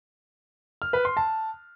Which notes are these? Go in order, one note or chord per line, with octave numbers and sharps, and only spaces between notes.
F6
B4
C6
A5